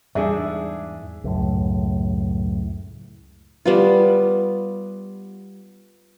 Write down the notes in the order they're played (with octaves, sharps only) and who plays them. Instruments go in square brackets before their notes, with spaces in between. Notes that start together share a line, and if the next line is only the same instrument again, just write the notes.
[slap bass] E2 G#2 [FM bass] G3 [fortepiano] D4 G#4 [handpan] E5
[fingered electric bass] C#2 F#2 A2
[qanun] G3 B3 F4